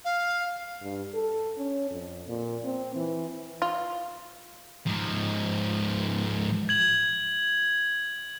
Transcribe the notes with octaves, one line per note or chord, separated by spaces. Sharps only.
F5
G2
A4
C#4
F2
A#2
C4
E3
F4
G#2 F3
G#6 F#7